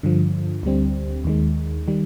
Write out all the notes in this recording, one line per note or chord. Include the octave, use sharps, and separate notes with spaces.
G2 D3 F3
D2 D3 G3 C4
D#2 D#3 G#3
D#3 G3